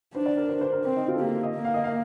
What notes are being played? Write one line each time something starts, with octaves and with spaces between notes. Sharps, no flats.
D4 C5
D5
A#4
C5
C5
A#4
C4 C5
D#4
F4
A4
A#3 G4
D#5
A#3
F5
D#5
F5